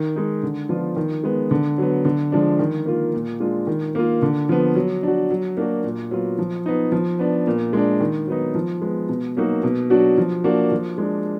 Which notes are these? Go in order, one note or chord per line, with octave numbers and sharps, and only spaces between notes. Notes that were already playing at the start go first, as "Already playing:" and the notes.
Already playing: D#3
G#3 D#4
D3
F3 B3 D4 F4
D#3
G#3 B3
D3
F#3 B3
D3
F3 G#3 D4
D#3
A#3 F4
A#2
G#3 D4 F4
D#3
A#3 F4
D3
F3 B3
F#3
D4 F#4
F#3
A#3 D4 F#4
A#2
F#3 B3 F4
F3
B3 D#4
F3
B3 D4
A#2
G#3 D4
D#3
F#3 B3 D#4
F3
G#3 B3
B2
F#3 A#3 D#4 F#4
B2
F#3 D4 F#4
F3
A#3 D4 F#4
F3
G#3 D4